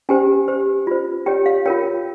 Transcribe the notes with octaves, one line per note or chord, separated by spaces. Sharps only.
C#4 G4 C5 G#5
G4 C5
F4 C5
G4 C#5 G5
F5
F4 A#4 C#5 G5